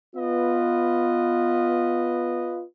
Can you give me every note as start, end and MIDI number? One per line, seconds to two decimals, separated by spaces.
0.16 2.63 59
0.16 2.63 65
0.16 2.63 71
0.16 2.63 75